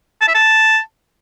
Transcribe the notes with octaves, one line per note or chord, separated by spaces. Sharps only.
A5
E5
A5